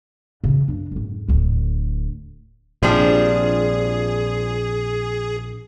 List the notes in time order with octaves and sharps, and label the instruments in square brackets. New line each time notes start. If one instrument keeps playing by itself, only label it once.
[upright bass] C#3 E3
F#2 D4
F2 G#2
D1 D2
[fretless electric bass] A#1 C3 [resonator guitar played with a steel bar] F3 G3 D4 [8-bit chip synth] G#4